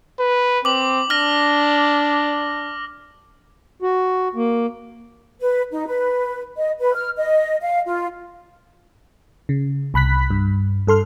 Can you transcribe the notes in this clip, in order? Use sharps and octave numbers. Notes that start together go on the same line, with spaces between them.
B4
C4 D6 F#7
D4 F6 A#6
F#4
A#3
B4
D#4
B4
D#5
B4
F6
D#5
F5
F4
C#3
C2 B5 F#6 B6
G2
G2 A4 C6 F6